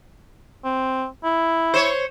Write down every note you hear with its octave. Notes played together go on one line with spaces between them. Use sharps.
C4
E4
C5 C#5